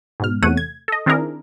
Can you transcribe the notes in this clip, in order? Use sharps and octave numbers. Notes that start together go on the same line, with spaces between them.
G#2 B2 F6
E2 C3 A3 C#5 F#5 D#7
G#6
A4 D#5
D#3 C4 D4 E4 G#4 A#4